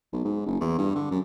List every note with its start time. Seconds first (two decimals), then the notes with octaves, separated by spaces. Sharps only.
0.13 B1
0.25 G#2
0.46 F#1
0.60 E2
0.78 G2
0.95 D3
1.11 F#2